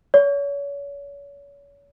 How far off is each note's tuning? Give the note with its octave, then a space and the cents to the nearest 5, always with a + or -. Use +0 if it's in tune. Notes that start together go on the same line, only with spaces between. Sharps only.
C#5 +35